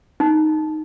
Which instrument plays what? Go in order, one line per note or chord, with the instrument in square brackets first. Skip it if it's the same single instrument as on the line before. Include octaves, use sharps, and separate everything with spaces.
[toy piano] D#4